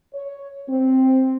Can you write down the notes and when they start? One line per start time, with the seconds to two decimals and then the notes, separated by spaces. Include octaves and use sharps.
0.15 C#5
0.69 C4